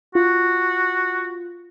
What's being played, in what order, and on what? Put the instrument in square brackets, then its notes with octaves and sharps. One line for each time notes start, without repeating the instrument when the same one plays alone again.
[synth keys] F4 [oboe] F#4